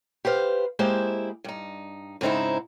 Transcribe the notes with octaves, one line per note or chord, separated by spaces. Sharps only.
G4 B4 C5 F5
G#3 A#3 E4 G4 C5 E5
G2 D#4
G#2 C#3 C4 D#4 E4